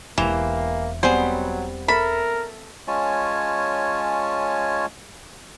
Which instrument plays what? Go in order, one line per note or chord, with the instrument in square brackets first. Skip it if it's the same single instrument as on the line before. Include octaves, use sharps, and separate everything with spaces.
[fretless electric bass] E1 [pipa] E3 [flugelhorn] A#3 [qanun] G4 C5 A#5
[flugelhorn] F#3 [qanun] G3 B3 C4 [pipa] G#4 C5
[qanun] A4 E5 [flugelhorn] A#4 [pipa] B5
[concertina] G#3 C#4 F4 C#5 G#5 A5